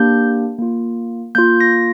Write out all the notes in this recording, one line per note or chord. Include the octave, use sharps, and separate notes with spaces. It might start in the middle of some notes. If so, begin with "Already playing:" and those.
Already playing: A#3 D4 G4 G6
A#3 F4
A#3 F4 G6
A#6